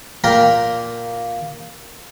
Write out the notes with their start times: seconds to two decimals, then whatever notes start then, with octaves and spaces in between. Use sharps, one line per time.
0.24 A#2 A#3 A#4 G5 A#5